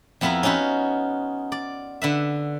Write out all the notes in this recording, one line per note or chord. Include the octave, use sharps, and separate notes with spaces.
F2 B3 E4 F4 E5 A#5
C#4 D#4 F4 F#4 B4
D5
D3 B4 E5